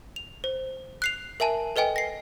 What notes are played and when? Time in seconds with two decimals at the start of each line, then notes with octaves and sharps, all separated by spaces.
0.16 F7
0.44 C5
1.02 F#6 C7 F7
1.40 A#4 E5 G#5 A5
1.76 A4 B4 D#5 G5 G#5
1.96 A#6 C7